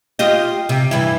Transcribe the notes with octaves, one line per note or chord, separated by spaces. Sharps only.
F4 G4 D#5
C3
G2 E3 E4